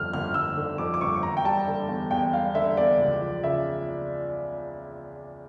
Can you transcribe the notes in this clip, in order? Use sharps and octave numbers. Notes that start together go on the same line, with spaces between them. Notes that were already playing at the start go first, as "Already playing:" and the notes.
Already playing: G1 F2 D3 F6
G1 F6
G1 E6
D3
F2 D6
D6
G1 C#6
E2 A#5
G5
G3 A5
D3
E2
E2 G5
G3 F5
D3 E5
E2 D5
C#2
F3
C#3 E5